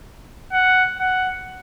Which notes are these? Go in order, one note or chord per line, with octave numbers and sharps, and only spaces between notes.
F#5
F#5